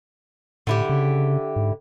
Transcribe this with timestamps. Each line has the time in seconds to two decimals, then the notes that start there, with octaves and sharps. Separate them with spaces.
0.67 A2 D3 E4 G4
0.89 C#3
1.56 G#2